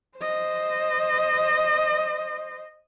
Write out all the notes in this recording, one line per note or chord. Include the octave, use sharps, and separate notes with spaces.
C5 D#5